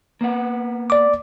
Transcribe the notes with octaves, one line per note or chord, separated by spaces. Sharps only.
A#3 B3 F#5
D5 D6